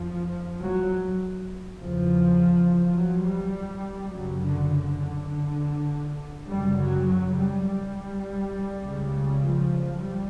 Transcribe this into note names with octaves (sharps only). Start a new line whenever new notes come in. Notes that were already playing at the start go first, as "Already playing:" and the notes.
Already playing: F2 F3
F#3
E2 C#3 F3
F#3
G3
F#2 C#3 F#3
D3
D3
F#2 C#3 G3
F#3
F#3
G3
G3
C#2 C#3
F3
G3